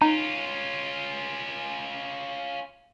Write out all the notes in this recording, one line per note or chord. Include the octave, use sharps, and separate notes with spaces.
C#4 D#4 F4